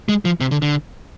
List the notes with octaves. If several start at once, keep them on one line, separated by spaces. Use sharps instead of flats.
G#3
F3
C3
D3
D3